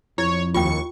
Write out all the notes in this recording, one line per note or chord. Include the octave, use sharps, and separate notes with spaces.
F2 E4 C#5
D#2 F4 G5 C#6